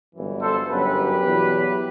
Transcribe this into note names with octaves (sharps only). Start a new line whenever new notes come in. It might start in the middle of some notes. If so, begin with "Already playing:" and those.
G1 F#2 E3
A4 C5
G1 F#2 F#3 G4 B4
E2 B2 F#3